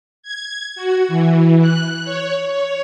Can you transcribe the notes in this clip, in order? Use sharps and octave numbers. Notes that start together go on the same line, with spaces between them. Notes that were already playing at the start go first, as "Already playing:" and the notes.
G#6
F#4
E3
F#6
C#5
C#5